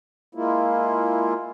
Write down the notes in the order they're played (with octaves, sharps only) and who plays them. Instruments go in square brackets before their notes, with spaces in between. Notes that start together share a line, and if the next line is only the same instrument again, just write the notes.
[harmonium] G#3 A#3 E4 F4